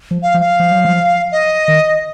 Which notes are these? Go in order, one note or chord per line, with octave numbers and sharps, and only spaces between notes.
F3
F5
F3
F5
F3
F#3
F3
D#5
D#3